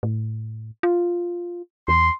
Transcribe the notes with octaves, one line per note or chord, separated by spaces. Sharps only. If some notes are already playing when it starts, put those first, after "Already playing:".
A2
F4
E2 C6